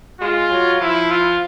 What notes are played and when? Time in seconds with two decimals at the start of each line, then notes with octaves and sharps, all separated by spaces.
0.21 G#3 F4
0.51 F#3
0.81 F3 E4
1.11 F4